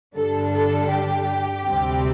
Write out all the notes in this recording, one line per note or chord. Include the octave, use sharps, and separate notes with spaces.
G2 D3 G3 D4 A4
A4
G4
D2 C3 G3 C4